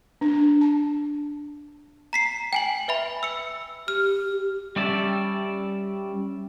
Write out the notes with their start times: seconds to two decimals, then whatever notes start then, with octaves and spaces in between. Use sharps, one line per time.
0.21 D4
0.61 A5
2.13 A#5 B6 C7
2.53 G5 G#5 F#7
2.88 B4 E5 B5
3.23 E6 C#7
3.88 G4 F6
4.76 G3 C#4 D5 E5 A5